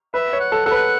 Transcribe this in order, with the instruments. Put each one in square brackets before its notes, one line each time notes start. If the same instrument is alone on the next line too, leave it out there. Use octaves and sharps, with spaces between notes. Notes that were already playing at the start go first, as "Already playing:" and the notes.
[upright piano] B4 [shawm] E5
[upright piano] C#5
[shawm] F#5
[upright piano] A4
[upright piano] A4 [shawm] F#5
[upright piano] B4